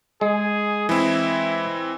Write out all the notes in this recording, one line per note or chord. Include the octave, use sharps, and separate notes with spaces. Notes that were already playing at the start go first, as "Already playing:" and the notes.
G#3 G#4
E3 C4 E4